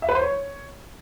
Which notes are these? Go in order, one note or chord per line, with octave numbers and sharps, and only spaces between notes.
E5
B4
C5
C#5